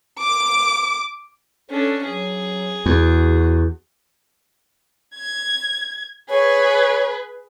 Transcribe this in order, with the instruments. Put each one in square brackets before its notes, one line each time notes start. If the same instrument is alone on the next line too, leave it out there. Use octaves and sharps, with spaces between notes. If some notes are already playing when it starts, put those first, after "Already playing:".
[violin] D6
[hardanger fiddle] C#4 D4 [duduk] A4
[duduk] F#3 [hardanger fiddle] G#4
[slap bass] E2 [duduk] F#4
[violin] G#6
[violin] G#4 B4 [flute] C#5